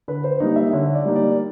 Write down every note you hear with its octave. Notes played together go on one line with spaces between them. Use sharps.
D3 B4
C5
G3 A#3 D#4 D#5
E5
D3 C#5
D5
G3 A#3 D#4
D5